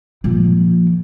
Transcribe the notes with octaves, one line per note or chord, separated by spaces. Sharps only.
A#2 F3